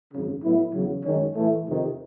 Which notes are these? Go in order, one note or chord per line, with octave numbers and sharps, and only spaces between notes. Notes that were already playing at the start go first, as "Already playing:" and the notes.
G#1 F#2 C#3
A2 F#3 B3 E4
E2 C#3 F#3
F#2 D#3 G#3 C#4
A2 E3 A3
F2 C3 D#3